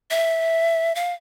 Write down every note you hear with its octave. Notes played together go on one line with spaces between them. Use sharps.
E5
F5